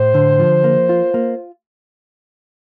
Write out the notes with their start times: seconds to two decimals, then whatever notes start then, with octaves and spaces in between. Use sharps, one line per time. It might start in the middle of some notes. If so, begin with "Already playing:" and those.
Already playing: A2 C5
0.14 D3
0.39 F3
0.64 A#3
0.89 F4
1.14 A#3